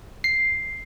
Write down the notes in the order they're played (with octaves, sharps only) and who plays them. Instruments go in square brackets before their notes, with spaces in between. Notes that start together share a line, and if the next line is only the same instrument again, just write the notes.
[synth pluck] C7